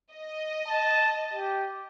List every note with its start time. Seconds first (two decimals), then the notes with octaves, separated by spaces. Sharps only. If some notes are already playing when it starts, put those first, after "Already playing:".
0.13 D#5
0.67 A5
1.34 G4